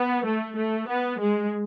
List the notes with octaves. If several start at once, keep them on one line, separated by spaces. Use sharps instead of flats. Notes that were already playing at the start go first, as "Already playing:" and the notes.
Already playing: B3
A3
A3
B3
G#3